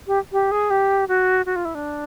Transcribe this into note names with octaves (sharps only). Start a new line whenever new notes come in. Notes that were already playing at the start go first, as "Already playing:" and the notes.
G4
G4
G#4
G4
F#4
F#4
F4
E4
D4